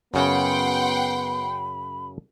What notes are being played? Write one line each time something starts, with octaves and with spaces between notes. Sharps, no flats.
F#2 C#3 B3 F#5 G5 B5 C6